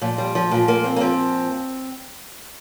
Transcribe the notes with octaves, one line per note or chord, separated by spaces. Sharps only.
A#2 F3
G3
F3
A#2 F3
A#3
C4
A#3
A#2 F3 C4